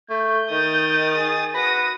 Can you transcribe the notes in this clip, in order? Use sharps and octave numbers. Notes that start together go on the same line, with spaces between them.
A3 G6
D#3 D#6 A6
G#4
F#4 B4 D#6 A#6